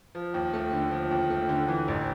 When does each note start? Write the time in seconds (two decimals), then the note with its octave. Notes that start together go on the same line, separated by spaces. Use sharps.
0.15 F3
0.34 D#2
0.53 A3
0.73 D3
0.91 F3
1.11 D#2
1.30 A3
1.49 D3
1.68 E3
1.88 A1